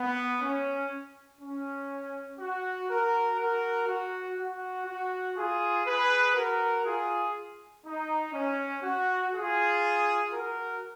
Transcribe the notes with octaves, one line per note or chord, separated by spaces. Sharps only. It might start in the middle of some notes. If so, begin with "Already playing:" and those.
Already playing: B3
C#4
C#4
F#4
F#4 A#4
F#4 A#4
F#4
F#4
F#4
F4 G#4
G#4 B4
F#4 A#4
F4 G#4
D#4
C#4
F#4
F4 G#4
F#4 A#4